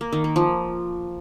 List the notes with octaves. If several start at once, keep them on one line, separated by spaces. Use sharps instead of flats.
A#3
D#3
A#3
F3